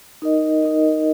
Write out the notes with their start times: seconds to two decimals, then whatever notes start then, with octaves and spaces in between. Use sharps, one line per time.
0.22 D#4 A#4 D#5
0.62 D#4 A#4 D#5